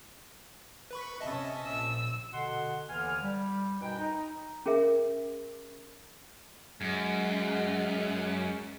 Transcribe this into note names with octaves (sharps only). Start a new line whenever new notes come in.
B4 B5 C#6
C3 C#4 D#5 E5 A5
A#1 E6
B2 D3 F#5 C6
D#2 D3 E3 B3 G#5 F6
G3
F#2 B2 D#4 B4 G5
D#4
C#4 G#4 A#4 E5
F#2 G#3